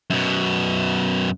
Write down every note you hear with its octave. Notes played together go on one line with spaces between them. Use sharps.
F#2 B2